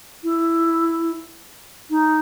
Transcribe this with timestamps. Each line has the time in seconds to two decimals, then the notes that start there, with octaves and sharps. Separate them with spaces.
0.24 E4
1.90 D#4